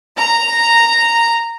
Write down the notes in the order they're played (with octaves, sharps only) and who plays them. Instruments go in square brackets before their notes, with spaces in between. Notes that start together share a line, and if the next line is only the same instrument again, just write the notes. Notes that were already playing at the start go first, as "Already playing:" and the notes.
[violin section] A#5